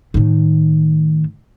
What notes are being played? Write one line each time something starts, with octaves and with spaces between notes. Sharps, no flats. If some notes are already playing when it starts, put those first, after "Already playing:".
A2 D#3